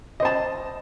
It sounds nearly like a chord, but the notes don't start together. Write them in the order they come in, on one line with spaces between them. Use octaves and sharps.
D#5 C5 A5